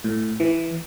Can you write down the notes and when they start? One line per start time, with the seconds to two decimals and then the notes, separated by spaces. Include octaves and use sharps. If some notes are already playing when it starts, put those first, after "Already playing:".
0.04 A2
0.40 E3